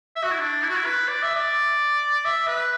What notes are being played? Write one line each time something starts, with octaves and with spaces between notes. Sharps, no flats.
E5
F#4
E4
D4
E4
F#4
E4
B4
D5
E5
D5
E5
B4